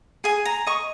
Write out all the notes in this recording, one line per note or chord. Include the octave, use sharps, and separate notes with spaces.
G#4 G#5
A#5
D#5 C#6